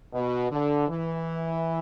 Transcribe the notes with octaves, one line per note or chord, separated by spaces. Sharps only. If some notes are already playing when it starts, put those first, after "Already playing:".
B2
D3
E3